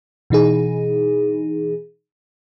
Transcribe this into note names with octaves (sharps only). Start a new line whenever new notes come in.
B2 E3 D#4 G#4